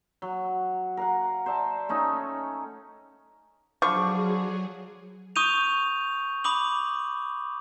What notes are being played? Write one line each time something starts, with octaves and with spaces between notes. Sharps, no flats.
F#3
A#4 F5 F#5
C5 D5 E5 A5
A3 C#4 D#4
D3 F3 F#3 G#4 C#6
C#6 D#6 G6 D#7 F7
B5 D6 D#6 F#7